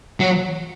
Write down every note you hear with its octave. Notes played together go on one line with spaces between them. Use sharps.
F#3